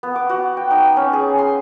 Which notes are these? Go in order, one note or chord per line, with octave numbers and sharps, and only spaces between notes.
B3
D6
F#4
G5
D#4
C#4
G#4
C6